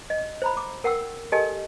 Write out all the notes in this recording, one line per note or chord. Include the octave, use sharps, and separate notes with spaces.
D#5
C5 A#5 B5
D6
A#4 F#5 G5 E6
G4 A4 A#4 D#5 G#5 A5